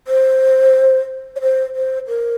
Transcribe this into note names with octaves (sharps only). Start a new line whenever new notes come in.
C5
C#5
C5
C5
A#4